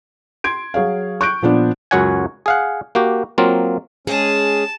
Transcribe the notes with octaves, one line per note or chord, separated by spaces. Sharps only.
C6 G#6 D7
F#3 G#4 C#5 F5
C#6 F#6 G6 D7
A#2 F3 B3 D4
C#2 F#2 F#4 C#5 F#5 G#5
G#4 F5 F#5
A#3 F#4 G4
F#3 A#3 C4 F4
G#3 C#4 G#4 A5